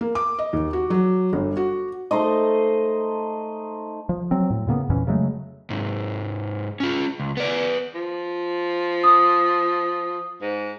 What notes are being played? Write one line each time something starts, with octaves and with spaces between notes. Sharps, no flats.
A#3
D6
D#5
D#2
F#4
F#3
G1
F#4
A3 D#4 C5 D#5
F3
F#3 C4
A2
A2 C#3 A#3 B3
F2 A#2 E3 C#4
C#3 F#3 G#3 A3
G#2 C3
C#4 F4
C#2
B3 D5
F3
D#6
G#2